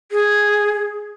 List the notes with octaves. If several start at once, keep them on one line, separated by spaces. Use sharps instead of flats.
G#4